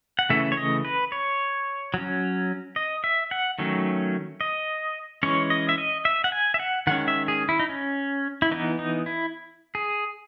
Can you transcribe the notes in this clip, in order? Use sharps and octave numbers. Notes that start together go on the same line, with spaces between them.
F#5
C#3 E3 A3 C#4 E5
C#5
D#5
B4
C#5
F#3 C#4
D#5
E5
F#5
D#3 F#3 A3 C#4
D#5
E3 G#3 C#4 C#5
D#5
E5
D#5
E5
F#5
G#5
E5
F#5
D#3 G#3 C#4 F#5
E5
G#4
E4
D#4
C#4
E4
E3 B3 D#4
D#4
E4
G#4